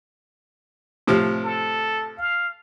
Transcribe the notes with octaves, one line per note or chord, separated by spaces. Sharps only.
A2 C3 F3
A4
F5